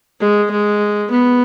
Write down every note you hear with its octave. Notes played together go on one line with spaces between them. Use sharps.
G#3
G#3
B3